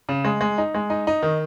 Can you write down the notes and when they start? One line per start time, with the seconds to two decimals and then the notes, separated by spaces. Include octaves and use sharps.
0.09 C#3
0.25 G#3
0.41 G#3
0.58 D#4
0.75 G#3
0.90 D#4
1.07 D#4
1.23 D#3